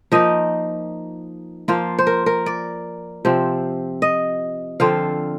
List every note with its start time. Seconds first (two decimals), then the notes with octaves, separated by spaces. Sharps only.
0.12 F3 A#3 D#4 D#5
1.68 F3 A#3 F4 F5
1.99 C5
2.07 A#4
2.26 A#4
2.46 D5
3.25 C3 F3 C4
4.02 D#5
4.80 D3 F3 C4 F4 F5